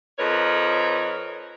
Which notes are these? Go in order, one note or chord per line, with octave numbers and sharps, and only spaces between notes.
F2 D#4 A#4 B4 C#5